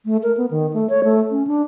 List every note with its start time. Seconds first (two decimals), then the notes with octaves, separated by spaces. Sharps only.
0.05 A3
0.23 A#4
0.37 B3
0.51 D#3
0.73 A3
0.90 C#5
1.04 A3
1.31 C#4
1.47 D4